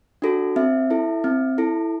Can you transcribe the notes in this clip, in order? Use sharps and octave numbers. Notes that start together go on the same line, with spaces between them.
D4 F#4 A4
C4 E5
E4 A4
C4
E4 A4